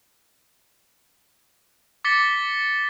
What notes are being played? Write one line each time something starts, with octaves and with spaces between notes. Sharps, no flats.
D6 A6 B6 C#7 G7